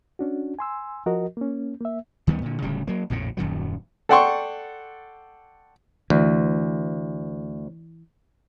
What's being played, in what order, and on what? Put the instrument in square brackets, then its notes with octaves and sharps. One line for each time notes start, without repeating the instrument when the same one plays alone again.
[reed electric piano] C#4 D4 F#4
G#5 C6 E6
F3 F#4 A#4 D#5
A#3 C#4
A#3 E5
[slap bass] D2 D#3 G3 B3
A#2 D3
D1 D2 C#3 G3
F#3 A#3
A#1 F2 A2 C#3
D#1 F#2 D#3 F#3
[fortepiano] A4 D5 F#5 G5 C6 C#6
[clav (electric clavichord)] D2 [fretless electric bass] E3